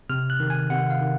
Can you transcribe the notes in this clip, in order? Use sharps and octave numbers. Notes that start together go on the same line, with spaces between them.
C3 F6
F#6
D#3
G#5
C3 F#5
F5
D#3